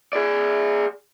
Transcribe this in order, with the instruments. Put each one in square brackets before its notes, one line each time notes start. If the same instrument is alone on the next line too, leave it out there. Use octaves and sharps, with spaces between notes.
[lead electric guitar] G#4 D5